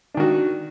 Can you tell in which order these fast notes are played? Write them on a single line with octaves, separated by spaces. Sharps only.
D4 D#3 F#4